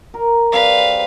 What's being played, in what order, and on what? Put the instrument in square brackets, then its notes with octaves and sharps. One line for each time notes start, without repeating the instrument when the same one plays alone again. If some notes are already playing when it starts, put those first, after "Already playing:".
[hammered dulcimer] A#4
[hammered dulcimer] G3 C4 G#4 [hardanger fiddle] B4 F5